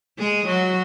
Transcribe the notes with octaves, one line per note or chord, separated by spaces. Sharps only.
G#3 G#4
F#3 F#4